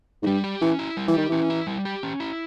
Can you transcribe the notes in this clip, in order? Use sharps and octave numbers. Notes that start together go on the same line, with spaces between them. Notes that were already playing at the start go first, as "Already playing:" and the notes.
G#2
G2 G3
G4
E3 C#4
E4
G3
E3
D#3 G4
E3 C#4
E4
G3
G4
C#4
E4